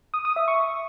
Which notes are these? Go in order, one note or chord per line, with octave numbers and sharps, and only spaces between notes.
D#6
D#6
E5
C#6